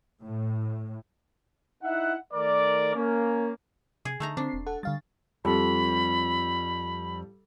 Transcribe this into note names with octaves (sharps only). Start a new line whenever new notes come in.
A2
D#4 E4 E5 F#5
D#3 A3 A#4 D5
A#3 C#4
C3 G#4
D3 A3 D#4 A#5
D3 C4 D4 C7
E1
A4 F#5 A5
D3 G3 F5 A6
F2 G3 A4 B5